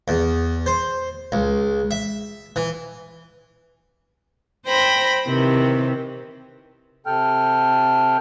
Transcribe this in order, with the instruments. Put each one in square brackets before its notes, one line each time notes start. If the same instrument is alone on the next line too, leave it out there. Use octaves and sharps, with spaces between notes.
[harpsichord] E2
C5
C#2
E5
E3
[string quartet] C5 G5 B5 A#6
C3 D#3 E3
[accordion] C3 A4 G5 F6